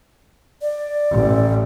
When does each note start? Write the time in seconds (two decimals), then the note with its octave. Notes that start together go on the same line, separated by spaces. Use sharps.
0.62 D5
1.11 A1